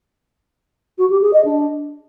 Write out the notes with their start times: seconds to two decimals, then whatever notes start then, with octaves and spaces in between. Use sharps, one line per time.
0.98 F#4
1.10 G4
1.22 G#4
1.33 D#5
1.45 D4